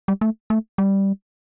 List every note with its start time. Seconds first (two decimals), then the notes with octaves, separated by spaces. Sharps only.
0.08 G3
0.21 A3
0.50 A3
0.78 G3